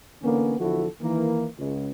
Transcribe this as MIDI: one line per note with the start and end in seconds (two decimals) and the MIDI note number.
0.23 0.55 50
0.23 0.55 52
0.23 0.55 58
0.23 0.55 59
0.23 0.55 61
0.59 0.87 40
0.59 0.87 50
0.59 0.87 53
0.59 0.87 64
0.59 0.87 66
0.59 0.87 69
1.01 1.48 51
1.01 1.48 52
1.01 1.48 58
1.58 1.91 37